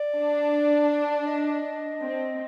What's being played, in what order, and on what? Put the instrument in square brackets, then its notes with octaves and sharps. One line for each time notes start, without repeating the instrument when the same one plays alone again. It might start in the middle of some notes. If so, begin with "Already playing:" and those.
Already playing: [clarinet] D5
[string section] D4
[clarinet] D#5
[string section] C4